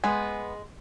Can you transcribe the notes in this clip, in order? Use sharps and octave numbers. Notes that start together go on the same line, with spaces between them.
G#3 B3 G#5